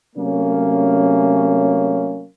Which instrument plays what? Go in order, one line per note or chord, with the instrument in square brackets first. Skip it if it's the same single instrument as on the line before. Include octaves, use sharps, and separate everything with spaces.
[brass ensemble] C3 F#3 A3 A#3 C#4